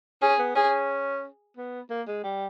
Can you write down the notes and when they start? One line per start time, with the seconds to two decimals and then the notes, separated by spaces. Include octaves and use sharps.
0.22 C#4 G#4
0.39 B3
0.55 C#4 G#4
1.57 B3
1.90 A#3
2.08 G#3
2.24 G3